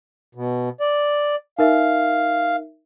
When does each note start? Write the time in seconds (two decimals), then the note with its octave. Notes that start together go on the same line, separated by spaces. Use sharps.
0.35 B2
0.81 D5
1.59 D#4 A#4 E5 F5